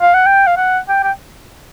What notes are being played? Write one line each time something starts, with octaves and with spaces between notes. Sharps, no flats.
F5
F#5
G5
F5
F#5
G5
G5